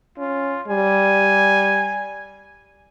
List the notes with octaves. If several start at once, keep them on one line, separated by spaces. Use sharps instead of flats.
C#4 F4
G3 G#5